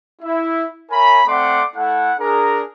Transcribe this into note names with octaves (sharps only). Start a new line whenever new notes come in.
E4
A#4 C#5 E5 G#5 B5
A3 C4 D5 F#5 C6 D6
A3 E4 A4 F#5
D4 G#4 A#4